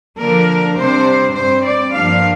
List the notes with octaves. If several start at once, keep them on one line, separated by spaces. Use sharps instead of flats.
D3 F3 A#3 D4 A#4
C3 G3 D4 C5
G2 G3 C4 C5
D5
G2 F3 A#3 D4 F5